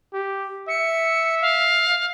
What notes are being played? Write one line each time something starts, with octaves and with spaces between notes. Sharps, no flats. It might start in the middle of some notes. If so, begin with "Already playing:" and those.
G4
E5 C#7
F5